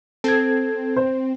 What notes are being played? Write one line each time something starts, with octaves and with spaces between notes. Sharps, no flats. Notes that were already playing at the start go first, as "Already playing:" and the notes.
C4 A4 G#6
C5